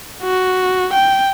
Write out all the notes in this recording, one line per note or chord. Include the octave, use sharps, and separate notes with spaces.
F#4
G5